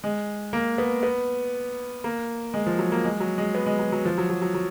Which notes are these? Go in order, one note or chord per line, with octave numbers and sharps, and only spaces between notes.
G#3
A#3
B3
B3
A#3
G#3
F3
F#3
A#3
G#3
F#3
G#3
B3
G#3
F#3
F#3
F3
F#3
F#3
F#3
F#3